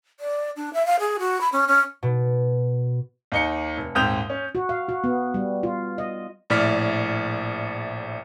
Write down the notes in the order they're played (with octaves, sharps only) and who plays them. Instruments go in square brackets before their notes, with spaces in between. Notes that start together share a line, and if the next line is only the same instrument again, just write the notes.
[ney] D5
D4
E5
F5
G#4
F#4
B5
C#4
C#4
[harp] B2
[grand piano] D#2 D#4 C#7
F1
D#1 G#2 C4 D#6 G6 F7
C#4
[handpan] F#4
F5
F#4
B3
G3
F4
D#5
[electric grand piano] A#1 A2 D5 F6 B6